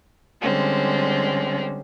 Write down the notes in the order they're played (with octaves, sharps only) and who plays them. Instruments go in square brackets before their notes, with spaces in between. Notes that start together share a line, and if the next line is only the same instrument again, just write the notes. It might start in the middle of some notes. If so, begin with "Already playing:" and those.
[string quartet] D3 G3 G#3 C4 C#4